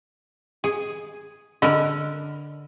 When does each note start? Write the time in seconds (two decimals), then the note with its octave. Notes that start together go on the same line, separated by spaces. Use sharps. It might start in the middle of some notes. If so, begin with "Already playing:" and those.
0.64 G#4
1.62 D3 A#4 D#5 B5